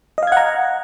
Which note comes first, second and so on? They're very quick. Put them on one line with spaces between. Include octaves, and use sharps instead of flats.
D#5 F5 G#6 F#5 A#5